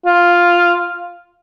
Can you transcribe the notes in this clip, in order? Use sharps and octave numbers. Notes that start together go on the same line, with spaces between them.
F4